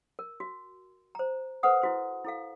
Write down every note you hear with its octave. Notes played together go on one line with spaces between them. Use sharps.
A#4
F#4
C5 A#5
A4 B4 C5 F#5 D#6
E4 F#4 C5
E4 A4 F5